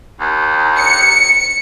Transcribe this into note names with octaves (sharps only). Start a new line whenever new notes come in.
D#2
C#7